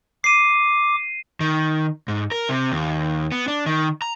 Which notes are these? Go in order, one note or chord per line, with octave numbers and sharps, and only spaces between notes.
D6 C7 D#7
D#3
G#2
A#4
C3
D#2
B3
D4
D#3
A#5